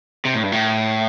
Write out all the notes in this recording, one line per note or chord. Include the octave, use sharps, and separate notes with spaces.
C3
A2
G2
A2